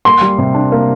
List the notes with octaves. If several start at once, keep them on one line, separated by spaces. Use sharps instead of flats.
A#3 C6
G3
C3
D4
A#3